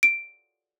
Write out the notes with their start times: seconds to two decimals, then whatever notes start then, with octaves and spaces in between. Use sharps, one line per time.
0.03 D7